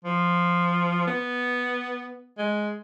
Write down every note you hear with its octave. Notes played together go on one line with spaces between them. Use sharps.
F3
B3
G#3